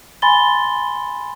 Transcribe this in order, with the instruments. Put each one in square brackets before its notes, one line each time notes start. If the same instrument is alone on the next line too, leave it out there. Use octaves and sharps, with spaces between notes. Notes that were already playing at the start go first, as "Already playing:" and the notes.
[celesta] G#5 B5 C6 A6 G7